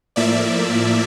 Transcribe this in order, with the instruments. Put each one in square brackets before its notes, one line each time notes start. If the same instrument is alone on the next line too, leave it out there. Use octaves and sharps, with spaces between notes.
[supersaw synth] A2 F3 A#3 D5 E5